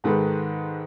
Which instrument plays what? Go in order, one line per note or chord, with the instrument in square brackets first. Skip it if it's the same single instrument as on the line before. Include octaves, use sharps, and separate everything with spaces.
[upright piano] G#2 D#3 G#3 A4 B4